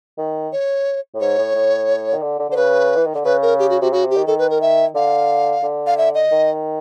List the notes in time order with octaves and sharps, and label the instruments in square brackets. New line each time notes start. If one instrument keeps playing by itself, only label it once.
[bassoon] D#3
[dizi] C#5
[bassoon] A2
[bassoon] G#2 [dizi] C#5
[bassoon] A2
A2
D#3
D3
D3
[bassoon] D3 [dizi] C5
[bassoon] C#3 [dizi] B4
[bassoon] E3
D#3
D3
[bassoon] C#3 [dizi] B4
[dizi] A#4
G4
F#4
[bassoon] C3 [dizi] F#4
[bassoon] C#3 [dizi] F#4
[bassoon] C3
[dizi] G4
[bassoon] D#3
[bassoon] D#3 [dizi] A4
[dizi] B4
A#4
E5
[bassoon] D3 [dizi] F5
[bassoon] D3
[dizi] F5
E5
D#5
[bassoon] D#3